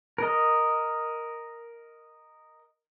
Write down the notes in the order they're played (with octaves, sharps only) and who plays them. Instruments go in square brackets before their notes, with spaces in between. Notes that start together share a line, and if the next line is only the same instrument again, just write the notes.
[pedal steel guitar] A#4 D#5